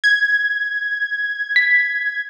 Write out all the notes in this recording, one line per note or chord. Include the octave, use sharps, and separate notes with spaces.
G#6
B6